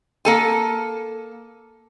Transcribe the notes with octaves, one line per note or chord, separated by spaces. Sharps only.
A#3 A4 G#5